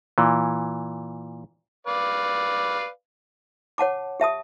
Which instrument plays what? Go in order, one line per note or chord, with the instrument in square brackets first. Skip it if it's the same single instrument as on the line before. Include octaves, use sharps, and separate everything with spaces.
[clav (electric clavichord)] A#2 E3
[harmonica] B4 D5 F5
[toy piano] C#5 F#5 A5 D6
G4 E5 A5 D#6